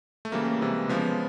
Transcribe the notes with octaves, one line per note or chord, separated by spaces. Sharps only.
A3
C#3 E3 G3 A#3
C3 E3 G#3
C#3 F3 G#3 B3